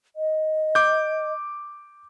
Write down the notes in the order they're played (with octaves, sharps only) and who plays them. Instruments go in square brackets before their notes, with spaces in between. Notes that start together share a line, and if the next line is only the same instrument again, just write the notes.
[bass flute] D#5
[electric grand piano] D6 G6